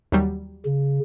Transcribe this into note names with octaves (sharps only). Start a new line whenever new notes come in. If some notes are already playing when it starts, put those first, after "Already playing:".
D#2 F#3 G3
C#3